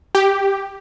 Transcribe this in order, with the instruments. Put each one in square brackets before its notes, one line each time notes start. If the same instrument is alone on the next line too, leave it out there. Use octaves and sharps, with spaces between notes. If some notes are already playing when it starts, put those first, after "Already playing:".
[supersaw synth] G4